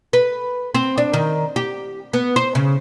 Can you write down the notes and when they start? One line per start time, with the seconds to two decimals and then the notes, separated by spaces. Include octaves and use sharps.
0.13 B4
0.74 C4
0.98 D4
1.13 D#3
1.56 G4
2.13 B3
2.36 C5
2.55 C#3